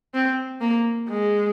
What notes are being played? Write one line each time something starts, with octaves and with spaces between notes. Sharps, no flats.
C4
A#3
G#3